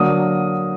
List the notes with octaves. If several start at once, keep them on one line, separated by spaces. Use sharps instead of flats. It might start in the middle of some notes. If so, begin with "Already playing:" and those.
Already playing: D3 F#3 A#3 D#6